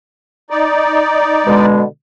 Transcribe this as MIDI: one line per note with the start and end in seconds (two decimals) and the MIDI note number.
0.50 1.66 63
0.50 1.66 74
1.47 1.83 47
1.47 1.83 50
1.47 1.83 56